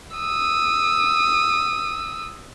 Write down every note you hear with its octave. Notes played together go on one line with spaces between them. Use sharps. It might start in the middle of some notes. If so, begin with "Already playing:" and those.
D#6 E6